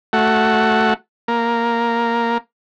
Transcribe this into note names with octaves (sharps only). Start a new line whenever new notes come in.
A3 F#4
A#3